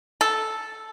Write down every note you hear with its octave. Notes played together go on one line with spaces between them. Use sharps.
A4